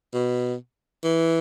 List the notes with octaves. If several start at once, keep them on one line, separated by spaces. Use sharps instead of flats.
B2
E3